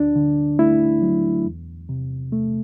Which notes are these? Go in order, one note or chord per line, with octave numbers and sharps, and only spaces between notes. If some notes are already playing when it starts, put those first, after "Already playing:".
Already playing: D2 D4
D3
A3 E4
F#3
E2
C3
A3